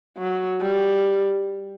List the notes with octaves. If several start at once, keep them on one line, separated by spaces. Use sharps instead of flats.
F#3
G3